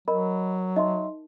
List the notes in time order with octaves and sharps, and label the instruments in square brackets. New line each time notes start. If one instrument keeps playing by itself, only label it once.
[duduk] F#3 [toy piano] A#4 [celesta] D#5 B5
[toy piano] D#4 [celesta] D#5 E5 C6